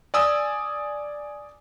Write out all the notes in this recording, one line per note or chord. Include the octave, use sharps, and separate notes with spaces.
D5 G#5 D#6 E6